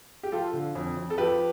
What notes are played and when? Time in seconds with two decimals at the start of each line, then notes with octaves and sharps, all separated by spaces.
0.23 G4
0.32 F3 F4 A4
0.53 D3
0.75 F2
0.97 F2
1.10 A4
1.18 F3 G4 B4